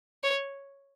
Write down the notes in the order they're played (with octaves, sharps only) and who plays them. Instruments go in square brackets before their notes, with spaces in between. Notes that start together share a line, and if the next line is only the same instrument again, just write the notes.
[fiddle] C#5